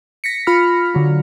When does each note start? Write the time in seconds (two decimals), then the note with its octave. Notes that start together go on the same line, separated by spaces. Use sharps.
0.24 A#6 B6 C#7
0.47 F4 B5 F6
0.94 D3 F#3